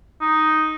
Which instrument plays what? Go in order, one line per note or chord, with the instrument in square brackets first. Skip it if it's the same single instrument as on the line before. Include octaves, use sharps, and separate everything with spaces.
[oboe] D#4